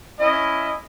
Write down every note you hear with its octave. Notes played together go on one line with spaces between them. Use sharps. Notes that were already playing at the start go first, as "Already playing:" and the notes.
C#4 E4 D#5